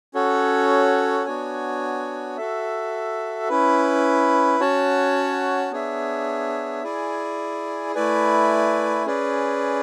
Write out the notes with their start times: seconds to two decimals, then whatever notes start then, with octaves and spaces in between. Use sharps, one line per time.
0.14 C#4 F#4 A4 C#5 F#5
1.25 B3 D4 F#4 C#5 G#5
2.37 F#4 A4 E5
3.49 C#4 E4 B4
4.60 C#4 F#4 C#5 F#5 A5
5.71 B3 D4 G#4 C#5 E5
6.84 E4 G#4 D5 G#5
7.95 A3 E4 B4 D5 G#5
9.06 C#4 G#4 B4 D5